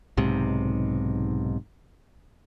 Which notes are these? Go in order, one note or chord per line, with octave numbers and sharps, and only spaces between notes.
B1 G#2 C3